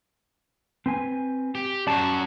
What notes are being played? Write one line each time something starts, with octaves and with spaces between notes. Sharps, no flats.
C4 B4 G#5
G4
F#2 F#4 D5 A5